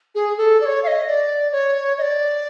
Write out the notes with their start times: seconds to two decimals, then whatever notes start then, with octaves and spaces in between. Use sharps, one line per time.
0.15 G#4
0.37 A4
0.61 D5
0.65 C#5
0.83 F5
0.87 D#5
1.07 D5
1.52 C#5
1.98 D#5
2.02 D5